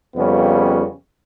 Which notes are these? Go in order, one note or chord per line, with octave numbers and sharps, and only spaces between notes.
F2 C#3 G3 B3 C#4